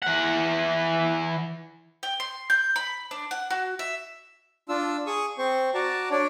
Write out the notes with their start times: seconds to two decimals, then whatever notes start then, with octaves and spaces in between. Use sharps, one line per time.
0.02 E3 F#5
2.03 G5
2.20 C6
2.50 G6
2.76 B5
3.11 D4
3.31 F#5
3.50 F#4
3.79 E5
4.69 D4 F4 E6
5.07 G#4 C#6 D#6
5.38 C4 C5 C#6
5.74 F#4 D5 A5 A#5
6.11 D4 C#5 D5